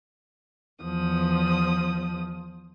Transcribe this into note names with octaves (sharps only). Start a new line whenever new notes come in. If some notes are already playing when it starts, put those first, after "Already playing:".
E2 F3 D#6